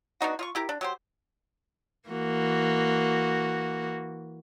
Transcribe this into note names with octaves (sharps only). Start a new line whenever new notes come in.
B3 D4 D#4 F#4
F4 D#5 C#6
E4 G4 A#4
D4
F#3 G4 C5
E3 A#3 F#4